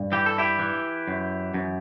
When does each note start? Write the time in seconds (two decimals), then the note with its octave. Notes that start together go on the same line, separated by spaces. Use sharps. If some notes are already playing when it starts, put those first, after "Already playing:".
Already playing: G2
0.12 E3 G4
0.26 A4
0.38 E4 G4
0.59 E3
1.08 F#2
1.54 F#2